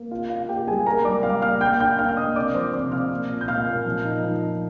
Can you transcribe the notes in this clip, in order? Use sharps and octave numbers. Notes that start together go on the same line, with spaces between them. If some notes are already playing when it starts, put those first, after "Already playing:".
Already playing: A#3
F4 F5
F4 F5
A#3 G4 G5
G3 G#4 G#5
A#3 A#4 A#5
G3 D5 D6
G3 F5 F6
A#3 F5 F6
A#3 G5 G6
D4 G5 G6
A#3 F5 F6
F6
A#3 D#5 D#6
C3 D5 D6
F3 C5 C6
C3 D5 D6
C3 F5 F6
A#3
A#2
G6
A#2 F5 F6
A#2
F3
D#4
F3
D#4